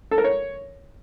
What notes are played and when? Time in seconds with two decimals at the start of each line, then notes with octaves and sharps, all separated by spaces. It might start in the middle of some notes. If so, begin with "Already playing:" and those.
0.11 A4
0.18 A#4
0.24 C#5